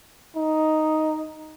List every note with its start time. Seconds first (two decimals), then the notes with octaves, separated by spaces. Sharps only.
0.36 D#4